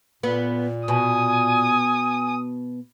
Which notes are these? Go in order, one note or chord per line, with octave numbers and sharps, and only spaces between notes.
A#2 B3
B2 G#5 D#6